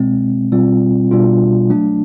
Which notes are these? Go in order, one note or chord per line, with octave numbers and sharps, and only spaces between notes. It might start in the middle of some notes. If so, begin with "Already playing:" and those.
Already playing: B2 G#3 C4
B2 G3 C4 F4
B2 G3 B3 D4 F4
F#3 A3 D4